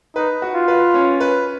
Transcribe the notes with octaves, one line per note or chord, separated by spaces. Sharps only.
D#4 B4
F#4
F4
B4
C#4
B4